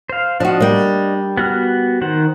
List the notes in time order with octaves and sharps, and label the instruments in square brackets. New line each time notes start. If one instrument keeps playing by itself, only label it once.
[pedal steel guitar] C5 F5
[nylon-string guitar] F3 F#4 [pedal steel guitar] D4 D#5
[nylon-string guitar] G3 A#3
[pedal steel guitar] B3 F#4 F6
D#3 C5 F#5